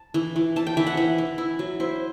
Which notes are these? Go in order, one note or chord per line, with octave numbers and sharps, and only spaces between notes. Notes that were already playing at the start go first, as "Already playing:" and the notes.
Already playing: A5
E3
E3
E3 A5
G5
E3 E5
F#5
E3 E5
E3
E4
F#3
E4 C5